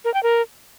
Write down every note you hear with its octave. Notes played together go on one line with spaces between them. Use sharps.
A#4
G5
A#4